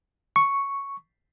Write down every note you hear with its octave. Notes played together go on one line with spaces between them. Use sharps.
C#6